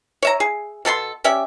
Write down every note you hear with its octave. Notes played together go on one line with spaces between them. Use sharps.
C#5 E5 A#5
G#4
B2 A4 B5 C6
C#4 G4 D5 E5